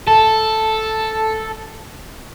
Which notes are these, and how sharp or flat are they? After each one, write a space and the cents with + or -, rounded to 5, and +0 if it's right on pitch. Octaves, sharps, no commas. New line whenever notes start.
A4 +0 A5 +0